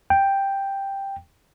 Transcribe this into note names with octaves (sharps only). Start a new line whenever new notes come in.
G5